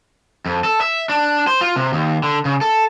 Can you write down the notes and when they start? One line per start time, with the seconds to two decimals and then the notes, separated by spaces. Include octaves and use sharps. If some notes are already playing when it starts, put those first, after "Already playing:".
0.46 F2
0.64 A4
0.81 E5
1.09 D4
1.47 C5
1.61 F4
1.76 C3
1.93 D#2
2.23 D3
2.45 C#3
2.61 A4